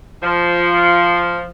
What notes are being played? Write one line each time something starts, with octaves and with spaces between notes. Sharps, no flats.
F3